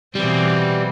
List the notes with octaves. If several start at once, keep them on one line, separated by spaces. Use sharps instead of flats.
B2 E3 G3 C4